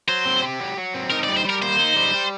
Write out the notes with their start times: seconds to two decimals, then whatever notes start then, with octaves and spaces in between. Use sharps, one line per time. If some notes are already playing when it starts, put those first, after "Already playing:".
0.08 F#3 C5
0.26 C4
0.43 G4
0.60 F#3
0.77 F#3
0.94 C4
1.10 D#4 A#4
1.24 D5
1.29 G3
1.37 C5
1.45 G3 A#4
1.62 A#3 C5
1.79 D#4
1.96 G3
2.14 G3